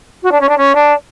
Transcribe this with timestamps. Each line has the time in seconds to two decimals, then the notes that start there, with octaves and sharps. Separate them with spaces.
0.23 F#4
0.31 D4
0.41 C#4
0.49 D4
0.57 C#4
0.75 D4